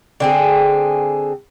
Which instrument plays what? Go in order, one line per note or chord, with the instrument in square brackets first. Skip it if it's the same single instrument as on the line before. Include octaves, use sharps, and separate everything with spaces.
[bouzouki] D3 C4 G#4